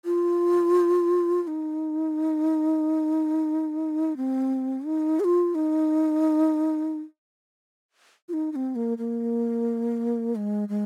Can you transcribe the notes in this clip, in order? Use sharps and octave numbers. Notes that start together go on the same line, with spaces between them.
F4
F4
D#4
C4
D#4
G#4
F4
D#4
F4
D#4
D#4
C4
A#3
A#3
G#3
G#3